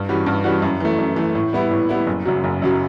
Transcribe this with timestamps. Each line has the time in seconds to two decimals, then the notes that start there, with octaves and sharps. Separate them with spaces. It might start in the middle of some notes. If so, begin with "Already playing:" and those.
Already playing: G2
0.09 E3 G3 C#4 F#4
0.26 G2
0.44 E3 G3 C#4 F#4
0.62 F#2
0.80 E3 A3
0.98 F#2
1.16 E3 A3
1.35 A2
1.53 G3 B3 E4
1.71 A2
1.89 G3 B3 E4
2.07 F#1
2.25 F#2 C#3 F#3
2.44 F#1
2.62 F#2 C#3 F#3